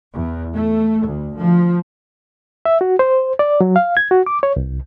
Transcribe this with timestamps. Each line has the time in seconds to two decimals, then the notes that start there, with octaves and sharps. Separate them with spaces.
0.14 E2
0.53 A3
1.05 D2
1.38 F3
2.65 E5
2.81 F#4
2.99 C5
3.39 D5
3.61 F#3
3.76 F5
3.97 G#6
4.11 F#4
4.26 D6
4.43 C#5
4.56 C2